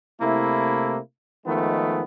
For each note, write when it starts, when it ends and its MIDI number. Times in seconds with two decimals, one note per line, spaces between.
0.21 0.98 48
0.21 0.98 57
0.21 0.98 58
0.21 0.98 64
1.46 2.03 51
1.46 2.03 53
1.46 2.03 56
1.46 2.03 57
1.46 2.03 59